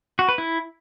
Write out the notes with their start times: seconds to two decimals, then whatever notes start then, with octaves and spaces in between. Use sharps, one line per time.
0.19 F#4
0.29 B4
0.38 E4